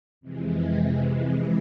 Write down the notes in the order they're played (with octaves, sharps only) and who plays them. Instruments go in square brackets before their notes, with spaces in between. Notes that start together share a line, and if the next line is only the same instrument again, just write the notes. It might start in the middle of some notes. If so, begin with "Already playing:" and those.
[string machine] F2 C3 E3 G#3